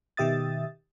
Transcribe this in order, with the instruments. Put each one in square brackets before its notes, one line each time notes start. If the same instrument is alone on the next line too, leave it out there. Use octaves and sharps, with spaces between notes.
[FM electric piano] B2 D#3 G4 E5 D#6 A6